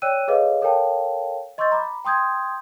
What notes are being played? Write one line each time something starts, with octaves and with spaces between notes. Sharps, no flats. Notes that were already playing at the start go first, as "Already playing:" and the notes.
C#5 D5 G5 E6 F#6 D#7
G#4 A4 B4 C#5 D#5 F5
A4 A#4 C#5 F5 G5 A5
D#5 C6 C#6 E6 G6 A6
A#5 B5 D6
G5 C6 D#6 G6 G#6